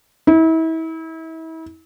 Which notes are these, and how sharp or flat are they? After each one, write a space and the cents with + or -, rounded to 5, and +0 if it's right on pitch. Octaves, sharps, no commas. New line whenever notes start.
E4 -35